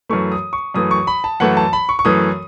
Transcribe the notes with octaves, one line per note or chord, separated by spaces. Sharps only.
F#2 E3 A3 C#6
D#6
C#6
F#2 E3 A3 D#6
C#6
B5
A5
F#2 E3 A3 F#5
A5
B5
C#6
C#6
F#2 E3 A3 D#6